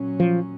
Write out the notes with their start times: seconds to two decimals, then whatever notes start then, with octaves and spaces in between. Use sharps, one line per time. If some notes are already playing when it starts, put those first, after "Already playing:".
Already playing: A#2 F#3 C#4
0.20 F3